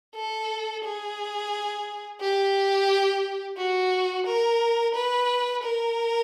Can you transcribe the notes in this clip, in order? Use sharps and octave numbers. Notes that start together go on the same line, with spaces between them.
A4
G#4
G4
F#4
A#4
B4
A#4